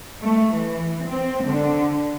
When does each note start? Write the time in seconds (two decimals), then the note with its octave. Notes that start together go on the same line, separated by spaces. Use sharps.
0.21 A3
0.56 E3
1.05 C4
1.47 D3